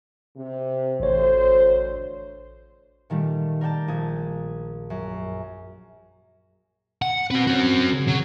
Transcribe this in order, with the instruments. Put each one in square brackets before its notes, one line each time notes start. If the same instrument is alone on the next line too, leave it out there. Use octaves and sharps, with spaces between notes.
[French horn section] C3
[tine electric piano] A1 C#5 [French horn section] D2 C5
[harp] A#2 D#3 G3 A3
A#4 D5 G5 A5
A#1 D#6 G#6
F#2
[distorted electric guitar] F#5
[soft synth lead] C4 [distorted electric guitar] F#4 B4
[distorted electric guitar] C#4 F#4
[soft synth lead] C#3
[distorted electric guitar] F#3